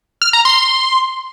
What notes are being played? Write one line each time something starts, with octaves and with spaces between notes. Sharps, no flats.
F6
A#5
C6